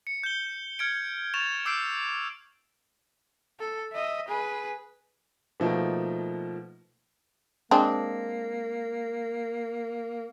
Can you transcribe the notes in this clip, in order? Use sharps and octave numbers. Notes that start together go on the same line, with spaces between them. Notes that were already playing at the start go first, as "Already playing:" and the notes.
C#7
G6 G7
F6 G#6 C#7 D7
C#6 A6 E7 F7
D6 E6 G6 C7 D7
A4
D#5 E5
G#4 B4
B2 F3 A3 A#3 D#4
G#3 A#3 C4 D4